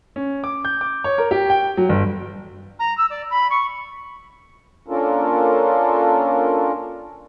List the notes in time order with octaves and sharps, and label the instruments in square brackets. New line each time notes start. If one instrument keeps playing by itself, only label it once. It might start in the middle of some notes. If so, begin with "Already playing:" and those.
[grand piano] C#4
D6
G6
D6
C#5
A#4
G4
G5
F#3
G1
[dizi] A#5
E6
D5
B5
C#6
[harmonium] A#3 C#4 D4 F4 A4 A#4